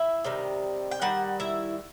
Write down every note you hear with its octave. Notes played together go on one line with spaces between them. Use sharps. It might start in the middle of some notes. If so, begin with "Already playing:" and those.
Already playing: E4 E5
C3 D#3 G3
G5
D#3 G3 F#5
E4 E5